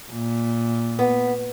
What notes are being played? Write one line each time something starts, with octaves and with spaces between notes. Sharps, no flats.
A#2
B3